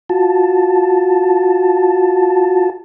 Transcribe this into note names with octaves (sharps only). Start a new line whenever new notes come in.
F4 F#4 A5